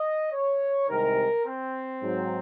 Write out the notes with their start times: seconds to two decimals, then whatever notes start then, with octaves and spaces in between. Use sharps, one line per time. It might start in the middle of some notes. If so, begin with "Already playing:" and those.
Already playing: D#5
0.32 C#5
0.88 C2 C3 D#3 G#3 A#4
1.46 C4
2.02 G#2 F#3